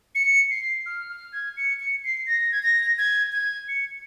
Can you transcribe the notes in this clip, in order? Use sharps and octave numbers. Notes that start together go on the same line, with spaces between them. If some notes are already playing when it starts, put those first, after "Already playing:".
C#7
C7
F6
F6
G#6
C#7
C#7
C7
A#6
G#6
A#6
G#6
G#6
C#7